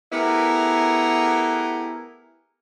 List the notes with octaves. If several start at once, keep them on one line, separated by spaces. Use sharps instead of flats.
A3 B3 E4 G4 G#4 A#4